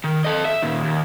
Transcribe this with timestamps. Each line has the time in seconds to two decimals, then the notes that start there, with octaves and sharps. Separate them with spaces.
0.04 D#3
0.25 A4 D#5
0.45 E5
0.63 A#2 D#3
0.84 D#2